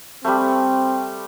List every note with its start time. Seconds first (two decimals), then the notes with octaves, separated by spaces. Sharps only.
0.25 G3 A3 C4